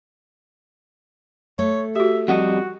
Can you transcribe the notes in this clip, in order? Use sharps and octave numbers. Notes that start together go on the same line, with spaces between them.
A3 A4 C#5
F#4 G4 E5
F2 G3 F#4 D#5 F#5